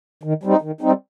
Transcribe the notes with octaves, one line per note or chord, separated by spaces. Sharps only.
D#3
G3 C4 D#4
D#3
G3 C4 D#4